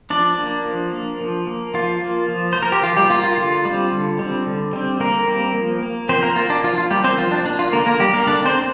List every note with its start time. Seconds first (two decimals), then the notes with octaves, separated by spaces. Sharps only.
0.10 F3 D4 D5
0.38 A#3
0.65 F3
0.93 A#3
1.20 F3
1.47 A#3
1.74 F3 F4
2.02 A#3
2.28 F3
2.53 A#3 C5
2.63 A#4
2.72 G4
2.83 F3 F4
2.97 G3 G4
3.10 A#3 F4
3.24 F4
3.38 D3 F4
3.65 G3 C4
3.92 D3
4.19 G3 C4
4.46 D3
4.73 G3 C4
5.00 D3 A#3 A#4
5.28 G3 C4
5.54 F3
5.83 A#3
6.09 F3 C4 C5
6.23 A#3 A#4
6.36 A#3 F4
6.50 D4
6.64 F3 F4
6.78 F4
6.90 G3 A#3 G4
7.04 C4 C5
7.18 F3 F4
7.31 D4
7.45 A#3 D4
7.59 F4
7.72 D3 A#3 A#4
7.86 A#3 A#4
7.99 G3 A#3 G4
8.14 A#3 A#4
8.27 D3 D4 D5
8.45 C4 C5
8.54 A#3